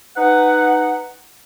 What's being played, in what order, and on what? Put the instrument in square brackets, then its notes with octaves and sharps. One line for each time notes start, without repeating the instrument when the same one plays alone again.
[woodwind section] D#4 B4 F#5